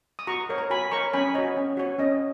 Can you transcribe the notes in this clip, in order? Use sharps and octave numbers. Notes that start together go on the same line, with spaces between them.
D#6
F#4 A#5 C#6
A#4 C#5
A#5
F#4 G#5 B5
A#4 C#5 A#5 C#6
C#4 G#5 B5
F#4 C#5 D#5
C#4
F#4 C#5
C#4 D#5